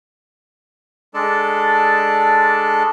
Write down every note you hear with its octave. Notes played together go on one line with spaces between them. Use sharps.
G#3 D4 A4 D5 A5